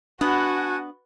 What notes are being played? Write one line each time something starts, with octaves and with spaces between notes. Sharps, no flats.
B3 D4 F#4 F#5 G#5 A5